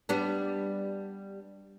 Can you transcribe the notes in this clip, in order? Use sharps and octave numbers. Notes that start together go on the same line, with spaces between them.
G3 B3 D4